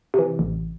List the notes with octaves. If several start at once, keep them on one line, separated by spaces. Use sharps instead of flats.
C3 E3
A1